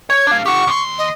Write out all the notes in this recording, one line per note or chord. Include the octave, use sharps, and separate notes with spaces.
C#5 G#6
D4 F5
G4 F#5 C#6
D#2 C6
D#5